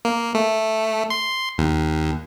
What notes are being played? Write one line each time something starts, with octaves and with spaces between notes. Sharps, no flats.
A#3
A3
C6
D#2